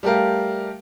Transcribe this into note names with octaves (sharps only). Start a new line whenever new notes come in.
G3 A3 G4 A#4 F5